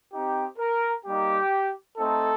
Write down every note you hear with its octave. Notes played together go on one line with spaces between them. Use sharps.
C4 D#4 G4
A#4
G3 A#3 D#4 G4
A3 C4 D#4 A4